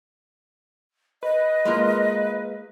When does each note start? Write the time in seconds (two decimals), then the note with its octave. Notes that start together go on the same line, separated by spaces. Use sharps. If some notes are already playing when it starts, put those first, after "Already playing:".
1.23 B4 D#5
1.65 G#3 A#3 F4